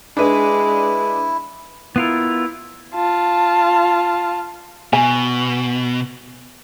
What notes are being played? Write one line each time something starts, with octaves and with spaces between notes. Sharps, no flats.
G#3 D4 E4 B4
B3 E4 F4 A#4
F4 A5
B2 G#5